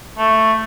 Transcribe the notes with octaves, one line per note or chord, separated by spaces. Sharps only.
A3